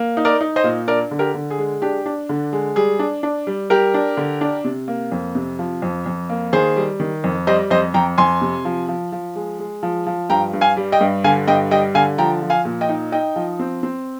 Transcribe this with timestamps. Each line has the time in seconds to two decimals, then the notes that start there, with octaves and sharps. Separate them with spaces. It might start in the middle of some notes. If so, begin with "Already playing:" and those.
Already playing: A#3
0.17 D#4
0.25 A#4 D5
0.41 D#4
0.56 C5 D#5
0.64 A#2
0.88 D4 A#4 D5
1.11 D3
1.19 G4 A#4
1.34 D3
1.51 G#4
1.58 G#3
1.82 D4 G4
2.06 D4
2.29 D3
2.53 G#3
2.76 G3 G#4
2.99 D4
3.23 D4
3.47 G3
3.70 G3 G4 A#4
3.94 D4
4.17 D3
4.41 D4
4.64 C3
4.88 A#3
5.12 F2
5.35 C3
5.59 F3
5.82 F2
6.06 F2
6.30 A#3
6.53 D#3 G#4 C5
6.76 G3
7.00 D#3
7.24 F2
7.47 G3 C5 D#5
7.71 F2 C5 D#5
7.94 F2 G5 A#5
8.18 F2 G#5 C6
8.41 C3
8.65 F3
8.88 F3
9.12 F3
9.36 G#3
9.59 G#3
9.83 F3
10.07 F3
10.30 G2 G5 A#5
10.53 G2
10.61 F5 G#5
10.77 G3
10.92 D#5 G5
11.01 G2
11.24 D3 F5 G#5
11.47 G2 D#5 G5
11.71 G3 D#5 G5
11.95 D3 F5 G#5
12.18 F3 G5 A#5
12.42 F3
12.50 F5 G#5
12.65 A#2
12.81 D#5 G5
12.89 D#4
13.12 D#4 D#5 G5
13.36 F3
13.59 C4
13.83 C4